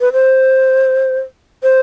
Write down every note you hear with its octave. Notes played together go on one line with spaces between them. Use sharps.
B4
C5
C5